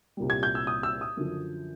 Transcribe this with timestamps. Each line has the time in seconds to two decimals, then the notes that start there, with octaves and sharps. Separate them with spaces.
0.17 C2 A#2 G3
0.30 G#6
0.43 G6
0.55 E6
0.67 D#6
0.83 E6
1.01 D#6
1.17 F#2 D3 F3